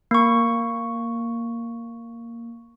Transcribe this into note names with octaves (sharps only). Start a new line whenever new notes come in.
A#3 C#6